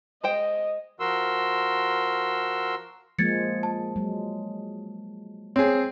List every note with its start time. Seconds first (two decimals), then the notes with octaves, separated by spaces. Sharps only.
0.23 G#3 C5 D#5 G5
1.00 F3 F#4 A#4 C6 E6
3.19 F3 G#3 A#3 G#6 A6 C#7
3.63 A5
3.96 F#3 G#3
5.56 C4 G#4 C#5